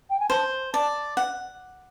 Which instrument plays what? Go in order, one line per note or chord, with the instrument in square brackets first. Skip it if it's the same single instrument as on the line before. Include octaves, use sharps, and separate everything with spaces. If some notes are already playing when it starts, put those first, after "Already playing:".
[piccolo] G5
G#5
[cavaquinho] C5 [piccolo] A5
[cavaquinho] D5 [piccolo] A5
[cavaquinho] F#5